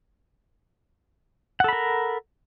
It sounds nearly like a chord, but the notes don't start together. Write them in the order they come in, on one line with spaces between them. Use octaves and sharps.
F#5 A4 B5 A#4